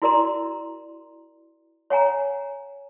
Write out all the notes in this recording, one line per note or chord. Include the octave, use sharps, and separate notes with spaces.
E4 F#4 A#4 D5 A#5 C6
C#5 F#5 G#5 A#5